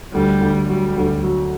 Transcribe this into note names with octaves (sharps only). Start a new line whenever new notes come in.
D2 G3
D2
F#3 G3
D2
F#3